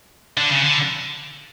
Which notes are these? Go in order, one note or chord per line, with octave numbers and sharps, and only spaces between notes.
D3
C#3
D3